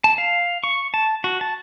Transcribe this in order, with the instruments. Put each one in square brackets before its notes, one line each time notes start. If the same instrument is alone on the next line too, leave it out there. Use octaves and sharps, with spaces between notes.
[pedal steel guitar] A5
F5
C#6
A5
F#4
A5